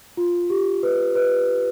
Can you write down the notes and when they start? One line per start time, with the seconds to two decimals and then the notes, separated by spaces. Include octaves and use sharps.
0.17 F4
0.50 G4
0.83 B4
1.15 B4